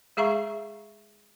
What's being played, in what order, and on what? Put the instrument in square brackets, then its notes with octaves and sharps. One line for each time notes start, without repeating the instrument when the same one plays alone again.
[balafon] G#3 G#4 E5 F5 A#5 C#6